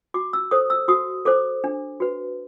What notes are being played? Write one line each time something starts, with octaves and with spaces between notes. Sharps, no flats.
F#4 D6
E6
A4 C5 D#6
E6
F#4 D#6
A4 C5 D6
D4
F#4 B4